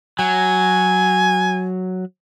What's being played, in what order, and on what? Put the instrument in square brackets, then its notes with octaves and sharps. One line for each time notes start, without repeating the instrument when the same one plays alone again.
[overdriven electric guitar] F#3 [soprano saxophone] G#5